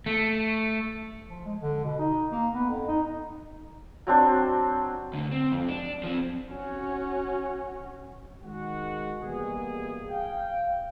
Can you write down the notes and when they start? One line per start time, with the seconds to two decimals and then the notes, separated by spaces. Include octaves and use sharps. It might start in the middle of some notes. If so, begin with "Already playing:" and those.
0.06 A3
1.28 F3
1.45 G#3
1.62 D3
1.84 B2
1.99 D#4
2.31 A#3
2.54 B3
2.69 F2
2.88 D#4
4.07 F#3 C4 D4 C5
5.14 D2 D3
5.32 C4
5.52 F2
5.68 D4
6.04 F3 C4
6.51 C#4 F#4
8.43 D#3 G#3 F#4 F#5
9.22 B2 E3 G3 A#3 G#4
10.09 F5 G5